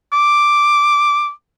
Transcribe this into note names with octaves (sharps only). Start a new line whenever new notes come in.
D6